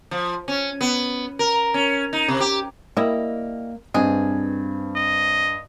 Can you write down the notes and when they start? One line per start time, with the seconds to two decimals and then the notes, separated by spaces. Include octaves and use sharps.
0.11 F3
0.48 C#4
0.81 B3
1.39 A#4
1.74 C#4
2.13 D#4
2.28 C3
2.40 G4
2.97 G3 A#3 E4 D#5
3.94 G2 G#3 C4 G#4 B4
4.96 D#5